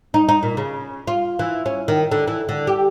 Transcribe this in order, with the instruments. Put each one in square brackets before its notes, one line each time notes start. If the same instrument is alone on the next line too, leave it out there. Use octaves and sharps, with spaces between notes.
[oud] D#4
D#4
A#2
C#3
F4
E3
C#4
D#3
D3
E3
D3
G4